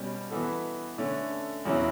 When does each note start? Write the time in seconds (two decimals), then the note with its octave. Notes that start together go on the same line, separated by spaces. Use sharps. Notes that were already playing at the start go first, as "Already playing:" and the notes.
Already playing: B2 G3 C#4
0.30 E3 B3 F#4 A4
0.98 D3 A3 C#4
1.65 E2 C#3 F#3 C#4 E4